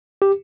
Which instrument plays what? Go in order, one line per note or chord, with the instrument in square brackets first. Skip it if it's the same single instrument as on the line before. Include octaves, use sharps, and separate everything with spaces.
[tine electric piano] G4